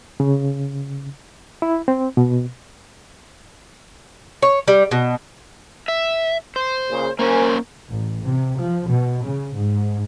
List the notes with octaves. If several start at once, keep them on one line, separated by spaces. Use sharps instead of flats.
C#3
E4
C4
B2
C#5
G3
B2
E5
C5
A#2 C#3
A#3 C#4 A#4 C5 G#5
A1
C3
F3
B2
C#3
G#2